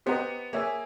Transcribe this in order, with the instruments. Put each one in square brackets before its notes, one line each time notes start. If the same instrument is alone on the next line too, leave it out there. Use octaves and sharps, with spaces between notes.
[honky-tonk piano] B3 [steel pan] G4 C5 D#5 F#5 A#5
[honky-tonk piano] A#3 [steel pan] G#4 C#5 E5 G#5